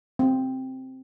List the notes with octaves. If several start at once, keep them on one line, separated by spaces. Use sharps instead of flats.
C4